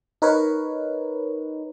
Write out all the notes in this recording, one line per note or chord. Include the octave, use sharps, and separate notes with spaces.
D#4 A#4 B4 C#5